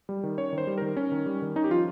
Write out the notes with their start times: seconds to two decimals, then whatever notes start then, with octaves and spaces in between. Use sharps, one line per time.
0.09 G3
0.23 D#3
0.38 C#4 C#5
0.53 D#3
0.58 C5
0.67 G3
0.78 D#3 A#4
0.97 C#4
1.12 D#3
1.26 G3
1.42 D#3
1.56 C#4 D#4
1.64 G4
1.71 F3 F4